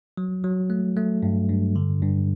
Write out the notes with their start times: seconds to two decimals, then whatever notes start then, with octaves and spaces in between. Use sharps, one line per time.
0.17 F#3
0.44 F#3
0.70 A3
0.96 A3
1.23 G2
1.49 G2
1.76 D3
2.02 G2